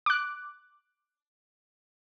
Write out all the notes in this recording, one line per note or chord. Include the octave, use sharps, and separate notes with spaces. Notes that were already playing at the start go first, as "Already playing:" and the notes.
D6 F#6